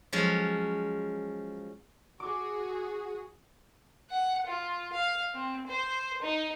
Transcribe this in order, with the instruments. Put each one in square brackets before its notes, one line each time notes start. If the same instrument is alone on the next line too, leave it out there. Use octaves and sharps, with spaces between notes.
[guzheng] F3 F#3 G#3 C#4
[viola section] F#4 G#4 [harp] D6
[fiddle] F#5
F4
F5
C4
C5
D#4